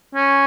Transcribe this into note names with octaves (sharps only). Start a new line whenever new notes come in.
C#4